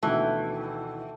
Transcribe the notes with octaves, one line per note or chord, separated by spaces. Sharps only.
D2 B2 D#3 E3 A3 G5